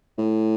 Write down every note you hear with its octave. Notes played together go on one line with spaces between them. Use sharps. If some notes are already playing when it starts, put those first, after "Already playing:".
A2